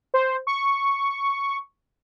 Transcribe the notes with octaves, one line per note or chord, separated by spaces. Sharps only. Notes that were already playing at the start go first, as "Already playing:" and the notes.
C5
C#6